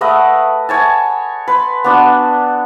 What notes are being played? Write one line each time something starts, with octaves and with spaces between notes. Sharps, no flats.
A3 B4 D#5 F#5
C#5 G#5 A5
B4 C6
B3 D4 F#4